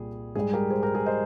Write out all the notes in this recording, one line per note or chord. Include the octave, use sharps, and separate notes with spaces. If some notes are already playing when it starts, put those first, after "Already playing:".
Already playing: C2 A#2 G3 G#4
G#2 G3 G#4
G4 A#4
G#4 C5
G4 A#4
G#4
C5 D#5